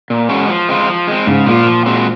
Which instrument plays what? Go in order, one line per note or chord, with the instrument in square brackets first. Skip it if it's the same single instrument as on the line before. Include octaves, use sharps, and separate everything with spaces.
[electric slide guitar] A#2
G#3 C#4 F#4
F3
G#3 C4 F4
F3
G#3 C4
[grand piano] G#2 [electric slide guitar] C#3
[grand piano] A#2 [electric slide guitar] F3 A#3 F4
[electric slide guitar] F3
G#3 C4 F#4